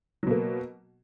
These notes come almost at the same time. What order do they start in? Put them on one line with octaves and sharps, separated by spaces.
F#3 B2 A#3